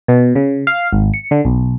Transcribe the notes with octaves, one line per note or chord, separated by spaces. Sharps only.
B2
C#3
F5
G#1
C#7
D3
B1